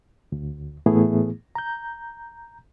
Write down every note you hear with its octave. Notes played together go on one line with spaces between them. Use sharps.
D2
A2 E3 A3 B3 E4 G#4
A#5 G6